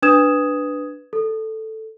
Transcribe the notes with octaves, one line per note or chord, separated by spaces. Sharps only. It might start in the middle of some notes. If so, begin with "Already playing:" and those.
D4 B4 D#6 G#6 E7
A4